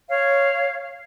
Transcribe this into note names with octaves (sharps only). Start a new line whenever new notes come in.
C#5 F5